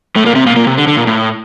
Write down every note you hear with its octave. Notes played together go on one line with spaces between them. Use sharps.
A2 A3
A#2 A#3
C3 C4
A#2 A#3
A#2 A#3
C3
D3
D3
A#2
A2